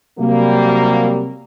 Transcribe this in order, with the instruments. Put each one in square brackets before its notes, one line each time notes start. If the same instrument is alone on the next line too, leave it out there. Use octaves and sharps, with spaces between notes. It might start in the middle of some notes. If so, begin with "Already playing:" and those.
[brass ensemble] C3 F#3 G3 A#3